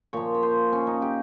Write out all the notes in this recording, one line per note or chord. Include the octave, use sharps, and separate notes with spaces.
A#2 F3 C#5
C#5
C5
C#4
D#4
G4